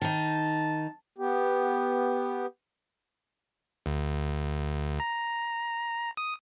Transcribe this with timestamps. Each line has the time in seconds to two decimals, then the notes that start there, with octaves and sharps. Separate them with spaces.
0.02 D#3 D#4 A5
1.18 B3 G4
3.86 D2
5.00 A#5
6.17 D#6